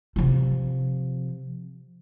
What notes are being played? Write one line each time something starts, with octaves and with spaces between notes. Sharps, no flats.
C3 F3